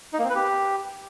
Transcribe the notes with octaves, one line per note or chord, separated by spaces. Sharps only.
D#4
A#3
C4
B4
G4